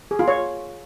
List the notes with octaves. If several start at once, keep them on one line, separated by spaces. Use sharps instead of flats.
G#4
F4
C#5